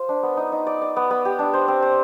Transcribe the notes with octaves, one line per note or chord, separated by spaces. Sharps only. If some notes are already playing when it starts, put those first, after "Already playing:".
Already playing: F4 C5
D4
B3
D#4
D#4
D5
D5
B3
B3
G4
D4
C5
C4
C5